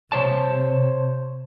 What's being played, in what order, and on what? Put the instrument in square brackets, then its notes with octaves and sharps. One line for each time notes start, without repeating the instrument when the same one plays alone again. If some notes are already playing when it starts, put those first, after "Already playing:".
[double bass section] C3 [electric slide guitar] C5 C#5 A5